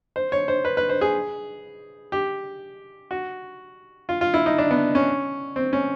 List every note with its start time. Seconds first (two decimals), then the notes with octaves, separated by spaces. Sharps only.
0.16 C5
0.32 C#5
0.48 C5
0.65 B4
0.77 B4
0.89 C5
1.01 G#4
2.12 G4
3.11 F#4
4.09 F4
4.21 F4
4.34 E4
4.46 D#4
4.58 D4
4.71 B3
4.95 C#4
5.56 C4
5.73 C#4